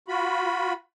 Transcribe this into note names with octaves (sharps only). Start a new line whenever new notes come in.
F4 F#4 B5